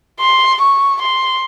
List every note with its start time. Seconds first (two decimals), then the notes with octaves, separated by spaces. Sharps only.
0.20 C6
0.61 C#6
1.02 C6